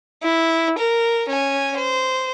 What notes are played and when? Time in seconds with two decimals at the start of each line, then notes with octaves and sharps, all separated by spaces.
0.23 E4
0.78 A#4
1.29 C#4 G#5
1.77 C5